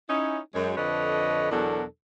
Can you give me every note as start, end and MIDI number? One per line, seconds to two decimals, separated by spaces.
0.09 0.39 61
0.09 0.39 63
0.09 0.39 64
0.55 0.73 42
0.55 0.73 56
0.55 0.73 73
0.77 1.51 41
0.77 1.51 50
0.77 1.51 71
0.77 1.51 73
0.77 1.51 75
1.52 1.84 40
1.52 1.84 47
1.52 1.84 54
1.52 1.84 62
1.52 1.84 69
1.52 1.84 70